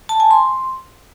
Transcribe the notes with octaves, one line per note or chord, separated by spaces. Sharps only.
A5
G#5
C6